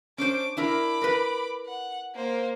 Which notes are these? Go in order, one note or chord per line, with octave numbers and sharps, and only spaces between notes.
C#4 D4 C5 D6
D4 E4 A#4 B5 D6
A#4 B4
F#5
A#3 C5